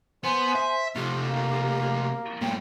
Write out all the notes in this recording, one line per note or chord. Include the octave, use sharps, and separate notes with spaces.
B3 C5 G#5
E5
C3 F3 A3 G4
A#3
G2 A#2 G5